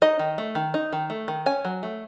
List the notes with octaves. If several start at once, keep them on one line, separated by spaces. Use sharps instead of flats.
D#4 D#5
D#3
A3
D#3
D#4
D#3
A3
D#3
C#4 G#5
F#3
A3